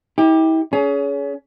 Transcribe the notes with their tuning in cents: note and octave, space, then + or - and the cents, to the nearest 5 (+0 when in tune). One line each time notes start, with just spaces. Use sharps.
E4 -45 G4 +15
C#4 +30 G#4 +25